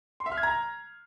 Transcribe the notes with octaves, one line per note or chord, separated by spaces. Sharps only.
C6
E5
F6
G#6
A#5